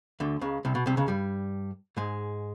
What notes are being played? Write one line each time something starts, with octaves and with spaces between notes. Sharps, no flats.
D2 D3
C#2 C#3
C2 C3
B2
C2 C3
C#2 C#3
G2 G3
G#2 G#3